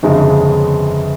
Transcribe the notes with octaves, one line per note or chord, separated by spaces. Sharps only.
G1 F2 C#3 G#3